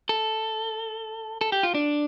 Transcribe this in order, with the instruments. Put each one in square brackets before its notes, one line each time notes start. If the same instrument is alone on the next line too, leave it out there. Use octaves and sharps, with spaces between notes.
[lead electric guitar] A4
A4
G4
F4
D4